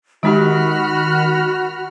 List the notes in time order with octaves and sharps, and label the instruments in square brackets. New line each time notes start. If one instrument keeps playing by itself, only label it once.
[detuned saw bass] D#3 [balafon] G#3 D#4 G4 [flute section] F#4 [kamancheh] B5 F6